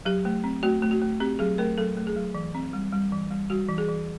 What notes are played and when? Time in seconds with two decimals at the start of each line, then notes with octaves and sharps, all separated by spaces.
0.05 F#3 G4
0.25 A3
0.44 C4
0.63 A3 F#4
0.82 A3
0.91 F#4
1.02 A3
1.20 C4 G4
1.39 F#3 G#4
1.58 A3 A#4
1.77 F#3 A4
1.97 A3
2.07 G#4
2.16 F#3
2.35 E3
2.55 C4
2.73 G3
2.93 G3
3.12 E3
3.31 G3
3.50 G3 F#4
3.68 E3
3.78 G#4
3.88 E3